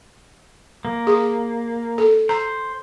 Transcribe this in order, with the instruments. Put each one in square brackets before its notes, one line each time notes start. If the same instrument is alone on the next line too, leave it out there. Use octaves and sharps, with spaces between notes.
[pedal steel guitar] A#3
[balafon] G#4
A4
[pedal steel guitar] C5 [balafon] A#5